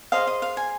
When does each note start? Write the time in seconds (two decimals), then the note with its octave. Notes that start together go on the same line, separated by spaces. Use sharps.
0.12 G#4 C5 D#5 F5
0.27 D#5
0.42 F5
0.57 G#5